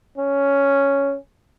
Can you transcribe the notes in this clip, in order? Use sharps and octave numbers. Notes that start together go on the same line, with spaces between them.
C#4